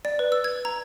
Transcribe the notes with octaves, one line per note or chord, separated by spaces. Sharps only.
D5
B4
E6
G#6
A#5